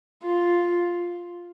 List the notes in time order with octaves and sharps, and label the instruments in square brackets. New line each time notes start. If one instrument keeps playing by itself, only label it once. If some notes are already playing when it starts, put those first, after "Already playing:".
[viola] F4